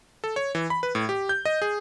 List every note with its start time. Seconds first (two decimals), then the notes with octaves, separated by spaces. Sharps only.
0.24 A4
0.36 C#5
0.55 E3
0.70 B5
0.83 B4
0.95 A2
1.09 G4
1.29 G6
1.45 D#5
1.62 G#4